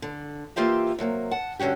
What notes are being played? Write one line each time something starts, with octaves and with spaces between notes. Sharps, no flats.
D3
E3 A#3 F4 G4 C5 E5
C3 F#3 A3 A#3
F#5 A5
G2 D3 C#4 F#4 G4